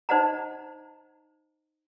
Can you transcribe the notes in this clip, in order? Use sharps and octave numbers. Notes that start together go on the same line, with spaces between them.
D#4 C5 D#5 F#5 A#5